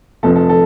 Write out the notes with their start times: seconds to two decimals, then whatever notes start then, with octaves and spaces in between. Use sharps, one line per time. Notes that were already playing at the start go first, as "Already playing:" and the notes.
0.23 F1 F2 F3 A4
0.36 A4
0.49 A4